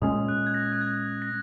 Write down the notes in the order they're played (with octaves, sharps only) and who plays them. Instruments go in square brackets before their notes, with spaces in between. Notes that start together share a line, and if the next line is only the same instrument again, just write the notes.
[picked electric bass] A#2 G#3 C#4 [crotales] D#6
[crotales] F#6
G#6
A#6
F#6
G#6
A#6